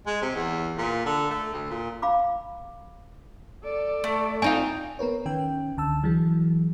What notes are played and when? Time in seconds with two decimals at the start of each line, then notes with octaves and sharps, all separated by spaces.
0.07 G#3
0.22 C3
0.35 E2
0.77 A#2
1.05 D3
1.30 A3
1.53 D2
1.70 A#2
2.02 F5 B5 D6
3.64 A4 D5
4.04 A3
4.42 C4 D#4 F4 G#5
4.99 B3 A#4 B4 C#5
5.26 D#3 C#4 G5
5.77 C#2 D3 A5 E6
6.04 E3 F#3 G#4